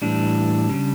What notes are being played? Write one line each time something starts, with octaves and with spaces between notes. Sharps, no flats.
A2 E3 G3 D4
C#3 G3